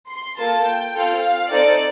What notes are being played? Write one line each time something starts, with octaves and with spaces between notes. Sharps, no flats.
C6
A#3 F4 A4 A5
G5
C4 F4 A4
F5
C4 D#4 A4 D5